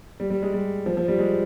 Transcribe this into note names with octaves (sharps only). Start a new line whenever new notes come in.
G3
G3
G#3
G3
F3
F3
G3
G#3